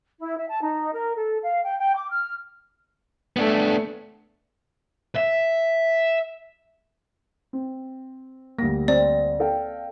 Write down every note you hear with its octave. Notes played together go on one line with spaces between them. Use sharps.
E4
E5
A5
D#4
A#4
A4
F5
G5
G5
D6
F6
A3 B3 D4
E5
C4
D2 G3 A#3 A#6
C4 D5
A4 F5 G5